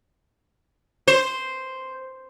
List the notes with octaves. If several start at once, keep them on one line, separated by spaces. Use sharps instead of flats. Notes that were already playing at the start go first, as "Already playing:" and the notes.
C5